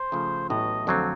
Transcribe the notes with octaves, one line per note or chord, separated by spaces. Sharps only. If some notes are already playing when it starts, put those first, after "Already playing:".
Already playing: C5
C#3 F3 A3
A1 A2 F#3 B3 D#5
F2 D3 F#3 A3 C4